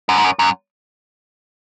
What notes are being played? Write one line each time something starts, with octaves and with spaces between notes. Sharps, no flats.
F#2
G#2
F#2
F#2